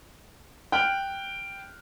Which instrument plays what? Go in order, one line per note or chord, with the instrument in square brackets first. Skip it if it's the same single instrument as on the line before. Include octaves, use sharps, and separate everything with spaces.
[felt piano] G5 F6 F#6